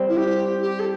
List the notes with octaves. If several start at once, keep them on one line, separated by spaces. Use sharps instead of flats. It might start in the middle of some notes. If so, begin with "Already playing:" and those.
Already playing: G3 C4
E4
G4
G4
A4